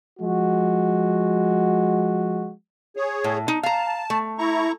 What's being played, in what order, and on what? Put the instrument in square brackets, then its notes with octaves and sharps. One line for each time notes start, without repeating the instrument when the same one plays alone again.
[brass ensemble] F3 G#3 F#4
[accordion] G#4 C#5
[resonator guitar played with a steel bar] A2
D#4
[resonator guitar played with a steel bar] F5 A#5 [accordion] A5
[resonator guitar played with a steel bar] A3
[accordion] E4 A#5 C#6